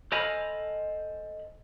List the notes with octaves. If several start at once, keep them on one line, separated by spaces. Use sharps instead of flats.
A4 C5 D#5 F5 G#5 B5